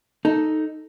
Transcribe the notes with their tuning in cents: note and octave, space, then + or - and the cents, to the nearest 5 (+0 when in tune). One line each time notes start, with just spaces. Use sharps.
D#4 +0 A4 +0